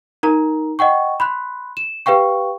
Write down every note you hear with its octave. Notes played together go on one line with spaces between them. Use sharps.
D#4 A#4 A#5
D#5 F#5 G5 C#6
B5 C6 F#6
E7
G4 B4 F5 G5 C#6